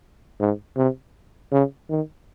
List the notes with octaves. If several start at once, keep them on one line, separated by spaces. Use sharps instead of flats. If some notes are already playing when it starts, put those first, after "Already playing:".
G#2
C3
C#3
D#3